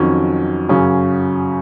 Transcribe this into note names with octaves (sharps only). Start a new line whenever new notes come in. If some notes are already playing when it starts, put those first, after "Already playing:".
Already playing: F2 D#3 F#3 C#4
F#2 C#3 F#3 C#4 G#4